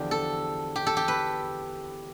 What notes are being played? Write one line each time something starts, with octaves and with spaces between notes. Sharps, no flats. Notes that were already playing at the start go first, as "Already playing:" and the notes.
Already playing: E2 D3 F3 G4
A4
G4
A4
G4
B4